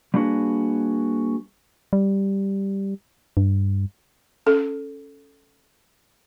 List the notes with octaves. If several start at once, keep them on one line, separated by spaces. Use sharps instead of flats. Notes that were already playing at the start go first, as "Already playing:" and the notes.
G3 A#3 D4 F#4 G#4 B4
G3
G2
C#4 A4